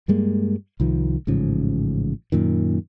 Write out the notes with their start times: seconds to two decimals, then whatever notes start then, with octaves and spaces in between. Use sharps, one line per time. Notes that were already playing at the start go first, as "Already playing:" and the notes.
0.08 G2 G3 G#3 A#3
0.80 C2 D#3 F3
1.27 A1 G#2 C#3 F3
2.32 F#2 A#2 D#3